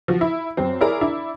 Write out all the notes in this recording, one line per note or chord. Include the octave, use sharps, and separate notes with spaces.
F3 F#4
E4
F#2 C4
E4 G#4 A#4 D5 A#5
D4 E4